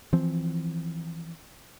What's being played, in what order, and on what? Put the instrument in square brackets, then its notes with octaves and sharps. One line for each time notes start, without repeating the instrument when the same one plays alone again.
[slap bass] E3 F3 C4